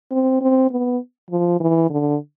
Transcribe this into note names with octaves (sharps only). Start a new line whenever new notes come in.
C4
C4
B3
F3
E3
D3